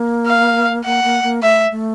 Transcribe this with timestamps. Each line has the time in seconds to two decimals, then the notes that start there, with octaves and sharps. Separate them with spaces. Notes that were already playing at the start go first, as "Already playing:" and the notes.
Already playing: A#3
0.27 F5
0.85 A#3 F#5
1.04 A#3
1.23 A#3
1.43 A3 E5
1.71 A3